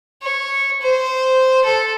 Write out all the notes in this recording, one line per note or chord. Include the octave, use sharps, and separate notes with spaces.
C#5
C5
A4